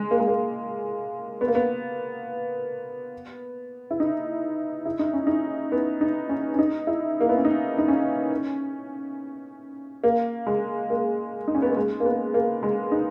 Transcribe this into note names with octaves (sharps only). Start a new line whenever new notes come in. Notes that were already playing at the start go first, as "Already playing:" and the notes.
Already playing: G#3
A#3
G#3
A#3
B3
A#3
B3
E4
D#4
E4
D#4
C#4
D#4
B3
D#4
C#4
C#4
D#4
E4
A#3
B3
C#4
D#4
D#4
C#4
A#3
G#3
A#3
D#4
C#4
B3
A#3
G#3
A#3
B3
A#3
G#3
D#4